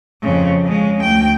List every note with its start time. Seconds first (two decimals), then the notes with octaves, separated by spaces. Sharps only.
0.22 F2 C#3
0.65 C#3 G#3
1.01 D2 G5